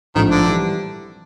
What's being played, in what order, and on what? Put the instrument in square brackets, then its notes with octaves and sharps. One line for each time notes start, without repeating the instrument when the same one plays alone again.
[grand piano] A#1 G#2 F3 A3 C4 [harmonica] D#3
[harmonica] D3
[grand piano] E3 G3